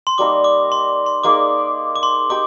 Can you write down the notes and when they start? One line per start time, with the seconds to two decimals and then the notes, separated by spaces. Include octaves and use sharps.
0.07 C6
0.18 G3 A#3 D#4 A#4 D6
0.44 D6
0.72 C6
1.06 C6
1.23 A#3 D#4 G#4 D5 D6
1.96 D6
2.03 C6
2.30 D#4 G4 D6